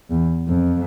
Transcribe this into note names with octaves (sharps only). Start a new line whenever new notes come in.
E2
F2